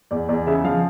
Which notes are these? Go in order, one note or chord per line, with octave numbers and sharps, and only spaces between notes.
E2 D5
E2 D5
C#3 E5
F3 F5